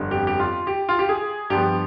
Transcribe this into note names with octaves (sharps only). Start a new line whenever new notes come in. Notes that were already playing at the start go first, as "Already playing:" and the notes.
Already playing: G1 F2 D3 G3
G4
G4
F4
G4
F4
G4
G#4
G2 F3 B3 G4